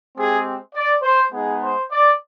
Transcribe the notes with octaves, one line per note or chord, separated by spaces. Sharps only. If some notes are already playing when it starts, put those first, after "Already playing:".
G#3 C4 G4 G#4
D5
C5
G#3 B3 D#4 G#4
C5
D5